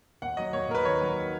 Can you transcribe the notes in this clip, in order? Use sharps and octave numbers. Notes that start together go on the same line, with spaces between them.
D#2 F#5
F#3 D#5
D#2 C#5
D#2 A#4
B4
D#3 C#5
F#3
D#3